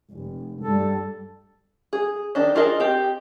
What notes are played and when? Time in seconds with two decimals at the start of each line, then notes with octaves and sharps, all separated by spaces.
0.11 F1
0.61 G2 G3 A4
1.93 G#4
2.35 D#3 D4 D#5
2.55 D4 F4 G#4 A#4 D#5
2.80 C4 G4